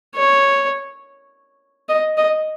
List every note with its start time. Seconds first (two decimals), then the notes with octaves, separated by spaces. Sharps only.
0.16 C#5
1.89 D#5
2.17 D#5